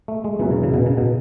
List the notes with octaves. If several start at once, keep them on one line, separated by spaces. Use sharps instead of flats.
A3
G#3
E1 E2 B2 E3 F#3 B3
C#3
C#3
B2
C#3
B2